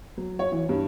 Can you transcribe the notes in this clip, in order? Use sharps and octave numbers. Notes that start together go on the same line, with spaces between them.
F#3
C#5
E3
G2